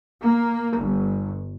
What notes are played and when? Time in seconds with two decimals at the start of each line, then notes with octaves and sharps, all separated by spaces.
0.21 A#3
0.77 G1